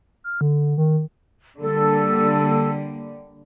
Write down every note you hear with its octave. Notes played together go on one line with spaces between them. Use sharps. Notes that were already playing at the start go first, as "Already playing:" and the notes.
F6
D3
D#3
D3 G3 A#3 A4